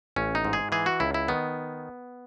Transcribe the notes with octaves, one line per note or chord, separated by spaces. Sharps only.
A1 C#4
D#4
G#2
G#4
E3 G#4
F#4
C#2 E4
E4
D#3 B3